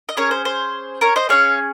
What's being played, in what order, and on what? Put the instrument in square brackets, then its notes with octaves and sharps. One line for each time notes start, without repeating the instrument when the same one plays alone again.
[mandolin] D#5
C#4 G#4 A#4 C#5
C5
C5
A#4 C#5
C5 D#5
C#4 G#4 C#5 F5